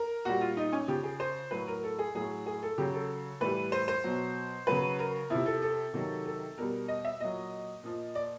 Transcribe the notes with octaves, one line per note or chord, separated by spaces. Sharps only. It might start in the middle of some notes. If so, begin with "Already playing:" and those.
Already playing: A#4
A#2 G3 F#4
F4
D#4
C#4
C#3 F3 G4
G#4
C5
A2 F#3 B4
A#4
A4
G#4
A2 F#3 G#4
G#4
A4
C#3 F#3 G4
A4
A2 E3 G3 B4
C5
C5
B2 F#3
C#3 F#3 B4
A#4
C3 F3 E4
A4
A4
C3 D#3 F#3
A4
B2 G3 A#4
D#5
E5
A#2 F#3 D#5
A#2 F3
D5